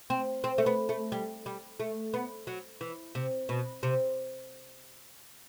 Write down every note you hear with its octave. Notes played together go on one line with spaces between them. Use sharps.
C4
C4
A3
B3
A3
G3
G3
A3
B3
F#3
E3
C3
B2
C3